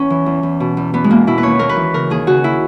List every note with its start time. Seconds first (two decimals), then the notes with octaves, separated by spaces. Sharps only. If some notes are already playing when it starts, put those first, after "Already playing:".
Already playing: E2 C#4
0.10 E3
0.26 E2
0.43 E2
0.60 B2
0.77 E2
0.93 E2 B3
1.04 G#3
1.10 B2 A#3
1.27 B2 E4
1.38 B4
1.43 D#2 C#5
1.59 D#2 A#4
1.69 B4
1.76 E3
1.94 C#3 A#4
2.10 D#2 G#4
2.27 C#3 F#4
2.44 D#3 E4